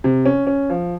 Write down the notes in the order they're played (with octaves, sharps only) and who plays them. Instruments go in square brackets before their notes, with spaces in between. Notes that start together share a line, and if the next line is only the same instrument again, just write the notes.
[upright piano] C3
C#4
C#4
F3